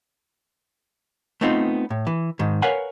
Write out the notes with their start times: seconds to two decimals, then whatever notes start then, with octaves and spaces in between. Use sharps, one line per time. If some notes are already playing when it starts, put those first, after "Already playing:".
1.41 A3 B3 C4 D#4 F4
1.90 A2
2.07 E3
2.39 G#2 D#3
2.62 A#4 B4 C#5 F5 F#5 G#5